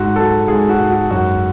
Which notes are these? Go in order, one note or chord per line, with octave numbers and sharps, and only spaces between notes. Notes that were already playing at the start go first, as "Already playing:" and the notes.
Already playing: G#2 F#4
F#3 A4
G#2 G#4
F#4
G#2
F#4
F#2 F#4